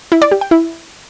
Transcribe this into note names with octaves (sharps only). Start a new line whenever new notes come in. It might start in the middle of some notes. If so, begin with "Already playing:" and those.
E4
D5
G4
G5
E4